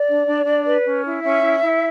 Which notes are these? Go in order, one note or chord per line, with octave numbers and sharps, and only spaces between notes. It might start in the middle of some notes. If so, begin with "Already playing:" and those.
Already playing: D5
D4
D4
D4
B4
C#4
E4
C#4 E5
E4
E4